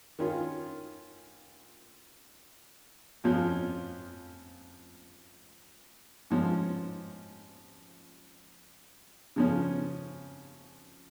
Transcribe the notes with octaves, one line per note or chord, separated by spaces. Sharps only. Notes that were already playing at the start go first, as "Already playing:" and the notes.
D#3 C#4 F4
F2 F3 C#4 F4
G#2 F3 C#4
C#3 F3 C#4